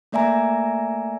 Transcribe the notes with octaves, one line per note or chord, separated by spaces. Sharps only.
A3 A#3 D5 E5 G#5 A#5